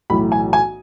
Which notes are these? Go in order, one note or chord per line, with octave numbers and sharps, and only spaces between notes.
B1 A2 E3 B5
G#5
G#5